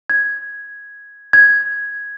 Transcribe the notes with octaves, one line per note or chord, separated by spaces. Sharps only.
G#6
G#6